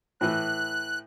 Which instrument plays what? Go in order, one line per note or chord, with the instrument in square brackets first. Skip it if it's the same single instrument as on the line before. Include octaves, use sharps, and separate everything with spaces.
[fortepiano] A2 E3 [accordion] F#6